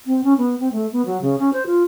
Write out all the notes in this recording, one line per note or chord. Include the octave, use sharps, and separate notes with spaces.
C4
C#4
B3
C4
A3
B3
F#3
C#3
C#4
C5
F4